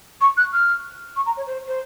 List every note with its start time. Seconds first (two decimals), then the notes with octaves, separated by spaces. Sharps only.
0.20 C#6
0.37 F#6
0.52 F6
1.15 C#6
1.25 A#5
1.36 C#5
1.46 C5
1.67 C5